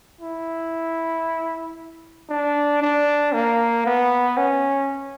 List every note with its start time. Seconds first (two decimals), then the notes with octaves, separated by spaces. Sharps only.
0.21 E4
2.29 D4
2.82 D4
3.33 A#3
3.86 B3
4.37 C#4